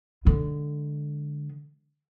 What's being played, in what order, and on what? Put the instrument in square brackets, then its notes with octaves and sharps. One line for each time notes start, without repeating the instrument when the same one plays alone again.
[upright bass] D3 G#3